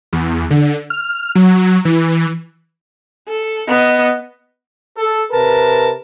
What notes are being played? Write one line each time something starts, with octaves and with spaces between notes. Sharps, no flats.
E2
D3
F6
F#3
E3
A4
B3 D#5
A4
C3 A#4 B4 A5